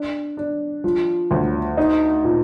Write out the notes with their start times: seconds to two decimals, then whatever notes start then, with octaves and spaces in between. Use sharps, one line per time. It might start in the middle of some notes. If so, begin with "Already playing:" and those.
Already playing: D4
0.37 D4
0.84 F3
1.31 D2
1.77 D#4
2.24 A#2